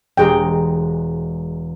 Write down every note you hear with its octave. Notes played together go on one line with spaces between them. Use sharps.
E1 G#3 G4 G#4 G5 A#5